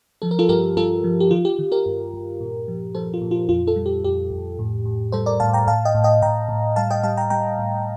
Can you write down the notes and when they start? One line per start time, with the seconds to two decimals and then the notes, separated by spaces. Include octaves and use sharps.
0.22 F3 A4
0.31 A#4
0.39 F4 A4
0.49 G2 G4 A#4
0.77 G2 F4 A4
1.04 F3
1.20 G4
1.31 D#3 F4
1.45 G4
1.59 D#3
1.72 G4 A#4
1.86 G2
2.14 G2
2.41 A#2
2.68 F3
2.95 F3 A4 C5
3.14 F4
3.21 A#2
3.31 F4
3.49 F2 F4
3.67 F4 A4
3.76 G3
3.86 G4
4.03 F2 G4
4.31 F2
4.59 A2
4.85 A2
5.12 G3 A4 C5
5.26 A#4 D5
5.40 A2 F5 A5
5.53 G5 A#5
5.67 A2 F5 A5
5.85 D#5 G5
5.95 A2
6.04 D#5 G5
6.22 A2 G5 A#5
6.49 A2
6.76 G3 F5 A5
6.90 D#5 G5
7.03 G3 F5 A5
7.17 G5 A#5
7.30 G3 G5 A#5
7.59 A2